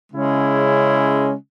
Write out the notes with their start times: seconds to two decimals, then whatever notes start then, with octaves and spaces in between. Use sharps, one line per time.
0.12 C#3 G#3 C#4 E4